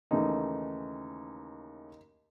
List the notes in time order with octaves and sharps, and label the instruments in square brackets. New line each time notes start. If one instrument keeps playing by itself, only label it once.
[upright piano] D#2 C#3 E3 A3 D#4